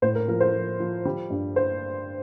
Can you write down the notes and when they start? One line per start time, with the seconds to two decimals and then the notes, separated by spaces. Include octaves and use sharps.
0.02 A2 C5
0.15 A#4
0.28 F3 A#4
0.40 C5
0.54 F3
0.80 F3
1.05 G3
1.30 G2
1.56 C5